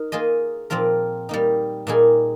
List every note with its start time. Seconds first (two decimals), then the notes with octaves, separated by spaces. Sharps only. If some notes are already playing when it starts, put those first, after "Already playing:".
Already playing: D#4 A#4
0.12 A#3 F4 G#4 D#5
0.70 A#2 F3 C4 F4 A#4
1.29 G3 A#3 D#4
1.87 A#2 G3 A#3 D#4 G#4